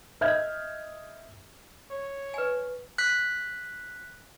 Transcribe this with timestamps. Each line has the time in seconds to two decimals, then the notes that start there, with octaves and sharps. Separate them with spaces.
0.21 D#5 E5 F6 G6 G#6
1.91 C#5
2.34 B4 G#5
2.98 F#6 B6